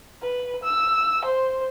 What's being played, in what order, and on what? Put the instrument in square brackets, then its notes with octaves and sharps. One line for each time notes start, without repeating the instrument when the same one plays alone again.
[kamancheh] B4
E6
C5